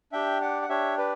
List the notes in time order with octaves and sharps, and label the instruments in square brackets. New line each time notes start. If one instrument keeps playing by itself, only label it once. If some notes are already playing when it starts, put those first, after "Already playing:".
[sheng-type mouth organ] D4 G4 E5 G5
D5 F#5
F#5
D4 G4 C#5 E5
B4 D5